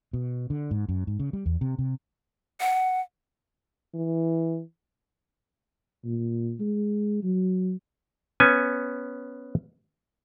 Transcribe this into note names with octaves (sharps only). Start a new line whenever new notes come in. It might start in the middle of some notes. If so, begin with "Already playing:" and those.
B2
D3
G#2
F#2
G#2
C#3
G3
E2
C3
C3
F#5
E3
A#2
G#3
F#3
B3 C#4 G#5